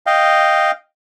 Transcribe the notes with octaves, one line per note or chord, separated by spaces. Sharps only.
D#5 F5 G5